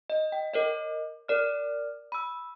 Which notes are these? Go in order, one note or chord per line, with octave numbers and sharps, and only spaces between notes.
D#5
G5
A#4 C#5 D#5
A#4 D5 F6
B5 E6